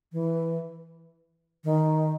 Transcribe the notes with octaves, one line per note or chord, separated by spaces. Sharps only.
E3
D#3